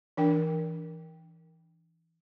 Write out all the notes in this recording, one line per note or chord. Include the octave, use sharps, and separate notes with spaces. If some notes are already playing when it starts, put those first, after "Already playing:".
E3 D4 A#4 G5